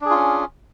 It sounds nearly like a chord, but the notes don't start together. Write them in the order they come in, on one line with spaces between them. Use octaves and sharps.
D4 G#4 F4 C#4